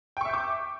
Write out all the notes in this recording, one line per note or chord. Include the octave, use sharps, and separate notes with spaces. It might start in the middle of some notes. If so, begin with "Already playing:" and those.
E5 G5 C#6 D6 G6